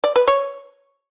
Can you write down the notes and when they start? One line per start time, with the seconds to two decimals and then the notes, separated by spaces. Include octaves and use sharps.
0.04 D5
0.16 B4
0.28 C#5